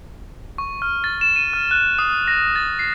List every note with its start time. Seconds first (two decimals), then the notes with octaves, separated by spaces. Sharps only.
0.58 C#6
0.82 F6
1.04 A6
1.21 E7
1.36 D#7
1.53 F6
1.71 F#6
1.99 D#6
2.28 A#6
2.56 A6
2.79 C7